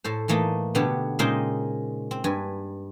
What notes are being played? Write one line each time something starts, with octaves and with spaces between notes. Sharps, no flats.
A2 A4 C5
A2 E3 A3 A#3 D#4
B2 D3 B3 D4 G4 C#5
A#2 C#3 G#3 D#4 C5 G5
C4
G2 B4 G#5